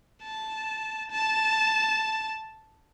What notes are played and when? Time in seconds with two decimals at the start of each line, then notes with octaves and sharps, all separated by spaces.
0.24 A5
1.11 A5